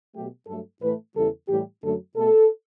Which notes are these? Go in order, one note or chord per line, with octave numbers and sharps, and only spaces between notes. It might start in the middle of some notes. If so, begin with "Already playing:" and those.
B2 F#3 A3 G4
G2 F#3 A3 A4
A2 E3 A3 B4
E2 C#3 E3 G3 A4
A2 E3 G3 G4
F#2 D3 F#3 A3 A4
B2 A3 A4